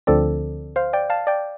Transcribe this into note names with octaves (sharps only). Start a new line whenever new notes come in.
D2 D3 F3 C4 A4 D5
C5 F5
D5 G5
F5 A5
D5 G5